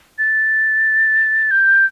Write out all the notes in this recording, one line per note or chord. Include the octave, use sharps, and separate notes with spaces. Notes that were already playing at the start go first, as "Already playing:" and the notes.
A6
G6